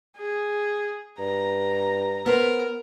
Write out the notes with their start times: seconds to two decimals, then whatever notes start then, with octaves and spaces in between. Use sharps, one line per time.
0.17 G#4
1.19 G2 A#5
2.26 B3 A#4 C5